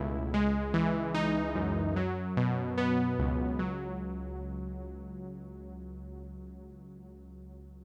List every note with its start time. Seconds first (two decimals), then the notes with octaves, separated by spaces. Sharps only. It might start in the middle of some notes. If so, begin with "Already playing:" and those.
Already playing: C#2 B2 A3 E4
0.34 G#3
0.74 E3
1.14 D#4
1.55 F#2
1.96 F#3
2.37 B2
2.78 B3
3.19 C#2
3.59 F#3